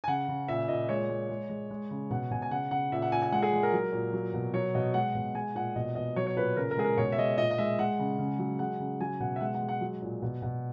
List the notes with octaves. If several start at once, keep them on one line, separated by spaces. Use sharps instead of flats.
G#5
C#3 F#5
C#3
A#2 E5
A#2 D#5
G#3 C#5
G#3
G#3
G#3
G#3
C#3
B2 F#5
B2 G#5
G#5
C#3 F#5
C#3 F#5
A#2 E5
F#5
A#2 G#5
G#5
G#3 F#5
G#4
G#3
A#4
F#3
A#2
F#3
B2
F#3 C#5
B2 D#5
G#3 F#5
B2
G#3 G#5
A#2 F#5
B2 D#5
B2 D#5
F#3 C#5
C#5
A#2 B4
C#3 A#4
A#4
G#3 G#4
A#4
B2 C#5
E5
G#3 D#5
A#2 D#5
D#5
G#3 E5
G#3 F#5
C#3
C#3
F#3
G#3 F#5
C#3
F#3 G#5
B2 F#5
E5
G#3 F#5
F#5
G#3
F#5
F#3
A#2
B2
B2